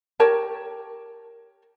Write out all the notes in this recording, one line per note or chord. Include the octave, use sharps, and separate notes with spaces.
G4 A#4 C#5 A5